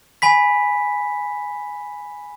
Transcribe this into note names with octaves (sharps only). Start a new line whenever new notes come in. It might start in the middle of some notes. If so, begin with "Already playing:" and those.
G#5 B5 B6